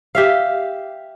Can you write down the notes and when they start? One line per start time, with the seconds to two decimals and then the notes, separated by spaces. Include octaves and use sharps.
0.15 G4 E5 F5